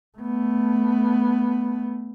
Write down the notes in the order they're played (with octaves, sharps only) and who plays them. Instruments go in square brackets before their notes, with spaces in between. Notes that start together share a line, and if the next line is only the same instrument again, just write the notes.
[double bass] A3 B3